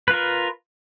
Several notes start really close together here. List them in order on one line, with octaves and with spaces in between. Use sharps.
B4 F4 A#4